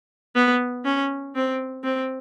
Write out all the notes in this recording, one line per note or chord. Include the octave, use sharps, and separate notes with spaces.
B3
C#4
C4
C4